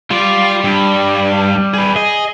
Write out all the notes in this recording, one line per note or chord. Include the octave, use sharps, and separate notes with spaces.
G3 F4 D5
G2
G#4 B4
G#4 D#5